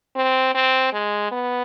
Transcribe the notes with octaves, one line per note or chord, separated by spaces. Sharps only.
C4
C4
G#3
B3